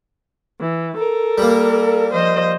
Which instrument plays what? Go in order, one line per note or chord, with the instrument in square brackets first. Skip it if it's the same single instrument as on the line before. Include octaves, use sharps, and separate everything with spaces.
[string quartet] E3
A4 A#4
[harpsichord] G3 A#3
[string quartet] F3 C5 D#5